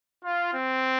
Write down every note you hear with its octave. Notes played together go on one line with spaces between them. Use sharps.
F4
C4